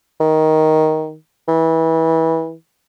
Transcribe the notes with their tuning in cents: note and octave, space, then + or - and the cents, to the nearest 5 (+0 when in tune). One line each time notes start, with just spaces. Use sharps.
D#3 +10
E3 -25